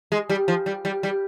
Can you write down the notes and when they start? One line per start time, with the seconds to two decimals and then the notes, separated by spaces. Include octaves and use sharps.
0.12 G#3
0.29 G3
0.48 F3
0.66 G3
0.85 G3
1.03 G3